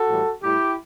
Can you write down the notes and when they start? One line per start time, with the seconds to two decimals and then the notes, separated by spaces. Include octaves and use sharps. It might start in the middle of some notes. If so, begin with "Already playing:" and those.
Already playing: F#4 A4
0.09 A2 E3 G3
0.43 A2 G3 E4 G4